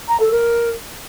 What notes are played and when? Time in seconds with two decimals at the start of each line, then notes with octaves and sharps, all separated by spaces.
0.08 A#5
0.19 A4
0.31 A#4